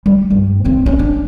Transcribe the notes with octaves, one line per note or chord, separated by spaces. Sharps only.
G3
G2
D#3 C4
C#4
D4